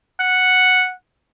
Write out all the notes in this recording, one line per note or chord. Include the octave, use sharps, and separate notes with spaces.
F#5